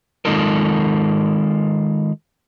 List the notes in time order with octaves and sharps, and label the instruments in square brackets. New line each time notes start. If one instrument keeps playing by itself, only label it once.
[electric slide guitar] D#3 G#3 D#4 F4 A4 A#4